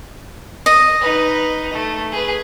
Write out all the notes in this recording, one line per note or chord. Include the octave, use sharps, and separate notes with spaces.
D#5
D#4 B4
A3
G#4 B4